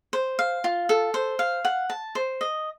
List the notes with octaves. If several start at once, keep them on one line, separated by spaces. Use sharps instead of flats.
C5
F5
F4
A4
C5
F5
F#5
A5
C5
D#5